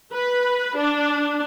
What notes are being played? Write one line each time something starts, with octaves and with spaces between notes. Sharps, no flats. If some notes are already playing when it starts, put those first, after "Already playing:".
B4
D4